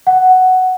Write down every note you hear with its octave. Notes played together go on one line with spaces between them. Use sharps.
F#5